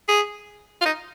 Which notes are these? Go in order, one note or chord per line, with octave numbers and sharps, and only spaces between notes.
G#4
F4
D#4